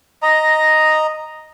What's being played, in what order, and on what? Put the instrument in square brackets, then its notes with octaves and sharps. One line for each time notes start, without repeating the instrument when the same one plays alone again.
[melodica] D#5 A#5